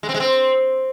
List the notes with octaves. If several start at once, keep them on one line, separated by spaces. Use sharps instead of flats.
G#3
C4
G#3
C4